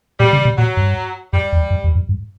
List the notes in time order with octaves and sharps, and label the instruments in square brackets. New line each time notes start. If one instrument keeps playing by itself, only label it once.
[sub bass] A#2 [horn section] G3
[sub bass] C#3
B2
[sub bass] A#2 [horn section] F#3
[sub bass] G2
[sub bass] F#2 [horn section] G3
[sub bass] E2
F#2
E2
F#2
G2